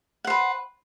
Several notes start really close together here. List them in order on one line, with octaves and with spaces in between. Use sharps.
F#5 C5 B4